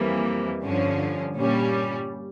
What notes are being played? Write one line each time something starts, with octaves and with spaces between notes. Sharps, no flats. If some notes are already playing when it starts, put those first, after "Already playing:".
Already playing: F2 E3 G3 A#3
G2 D3 F3 C#4
A#2 G3 C#4